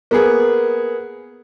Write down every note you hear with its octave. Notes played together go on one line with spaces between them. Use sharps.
A#3 B3 G#4